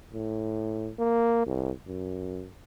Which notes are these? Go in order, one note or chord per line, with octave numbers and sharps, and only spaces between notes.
A2
A#3
C2
F#2